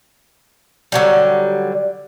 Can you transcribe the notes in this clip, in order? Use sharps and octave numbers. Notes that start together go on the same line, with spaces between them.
D3 F#3 G3